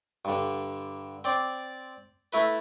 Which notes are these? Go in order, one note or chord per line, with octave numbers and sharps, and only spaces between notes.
G2 D3
C4 D5 D6
A3 E4 B4